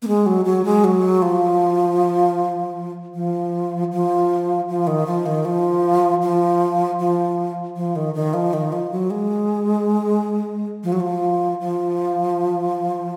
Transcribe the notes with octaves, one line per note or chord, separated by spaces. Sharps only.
A#3
G#3
F#3
F#3
G#3
F#3
F3
F3
F3
F3
D#3
F3
D#3
F3
F3
F3
F3
D#3
D#3
F3
D#3
F3
F#3
G#3
F3
F#3
F3
F3